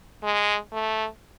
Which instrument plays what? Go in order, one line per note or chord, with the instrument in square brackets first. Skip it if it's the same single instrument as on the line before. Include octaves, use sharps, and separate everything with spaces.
[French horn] G#3
A3